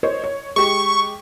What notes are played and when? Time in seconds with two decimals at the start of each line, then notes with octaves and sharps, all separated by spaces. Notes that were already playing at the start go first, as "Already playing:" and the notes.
0.03 C5 C#5 D#5
0.24 C#5
0.56 G#3 G4 C#6